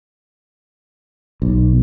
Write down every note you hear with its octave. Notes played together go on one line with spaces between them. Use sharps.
B1